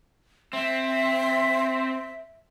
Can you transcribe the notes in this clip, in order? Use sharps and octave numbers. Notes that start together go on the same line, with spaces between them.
C4 E5